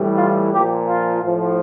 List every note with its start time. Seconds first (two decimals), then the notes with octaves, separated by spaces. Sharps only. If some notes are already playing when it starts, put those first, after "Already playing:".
Already playing: A2 E3 G3
0.16 F4
0.52 A#2 F3 G4
0.88 F4
1.23 A2 F3